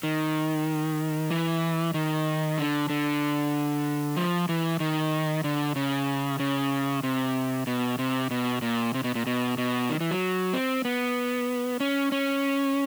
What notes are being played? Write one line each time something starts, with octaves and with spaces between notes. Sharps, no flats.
D#3
E3
D#3
D3
D3
F3
E3
D#3
D3
C#3
C#3
C3
B2
C3
B2
A#2
C3
B2
A#2
B2
B2
D#3
E3
F#3
C4
B3
C#4
C#4